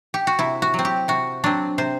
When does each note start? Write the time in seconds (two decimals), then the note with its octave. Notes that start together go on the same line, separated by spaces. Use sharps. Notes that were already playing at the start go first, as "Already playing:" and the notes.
0.14 G4
0.27 F#4
0.39 C3 E4
0.62 F#4
0.74 F#3 C4
0.85 G4
1.08 C3 F#4
1.44 F#3 C4 D4
1.78 C3 C5